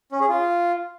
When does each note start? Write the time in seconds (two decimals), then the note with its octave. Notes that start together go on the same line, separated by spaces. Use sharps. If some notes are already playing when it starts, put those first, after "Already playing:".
0.12 C#4
0.20 G#4
0.29 F4